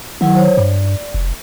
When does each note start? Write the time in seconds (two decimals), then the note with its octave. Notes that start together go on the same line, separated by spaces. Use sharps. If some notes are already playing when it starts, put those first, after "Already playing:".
0.21 D#3 F#3 E4 F#5
0.35 C5 C#5
0.57 G2 D5
1.14 F1